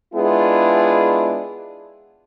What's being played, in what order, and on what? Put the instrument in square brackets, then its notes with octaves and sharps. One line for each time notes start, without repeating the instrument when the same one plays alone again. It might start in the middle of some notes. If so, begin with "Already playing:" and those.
[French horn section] G#3 B3 D4 E4 F4 G#4